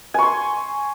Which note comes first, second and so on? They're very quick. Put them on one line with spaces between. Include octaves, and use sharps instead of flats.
G#5 C#6 C6